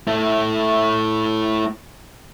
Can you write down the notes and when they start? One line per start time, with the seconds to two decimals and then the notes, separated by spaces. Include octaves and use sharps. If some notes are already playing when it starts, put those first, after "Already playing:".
0.07 A3 E4